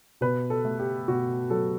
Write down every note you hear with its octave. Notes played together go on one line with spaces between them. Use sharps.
B2 B4
A4
A3
G4
B2 F#4
F#3 A4